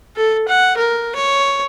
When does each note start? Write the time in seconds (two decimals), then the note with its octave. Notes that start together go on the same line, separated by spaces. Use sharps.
0.16 A4
0.48 F#5
0.78 A#4
1.16 C#5